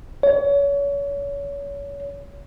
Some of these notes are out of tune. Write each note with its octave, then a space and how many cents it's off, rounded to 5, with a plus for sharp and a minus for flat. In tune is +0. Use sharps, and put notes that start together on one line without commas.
C#5 +30